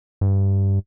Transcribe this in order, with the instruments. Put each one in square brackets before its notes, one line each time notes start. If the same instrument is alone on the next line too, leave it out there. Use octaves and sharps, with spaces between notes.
[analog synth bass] G2